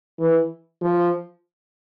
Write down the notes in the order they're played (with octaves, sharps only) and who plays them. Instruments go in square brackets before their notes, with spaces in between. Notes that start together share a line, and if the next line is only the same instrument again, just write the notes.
[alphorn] E3
F3